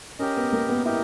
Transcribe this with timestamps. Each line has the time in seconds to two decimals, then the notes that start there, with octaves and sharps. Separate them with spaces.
0.19 C#4 G4 A#4 D#5
0.37 B3
0.53 A#3
0.69 B3
0.86 E4 G4 A#4 D#5